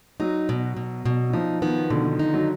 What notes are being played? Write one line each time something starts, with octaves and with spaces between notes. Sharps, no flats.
F#3 D#4
B2
B2
B2
F3 D#4
D#3 B3
B2 D3
D#3
D#4
F#3